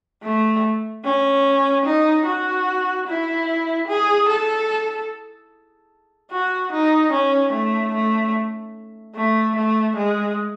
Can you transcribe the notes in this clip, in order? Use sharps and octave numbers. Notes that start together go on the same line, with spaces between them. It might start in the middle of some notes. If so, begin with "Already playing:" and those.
A3
C#4
D#4
F#4
E4
G#4
A4
F#4
D#4
C#4
A3
A3
A3
A3
G#3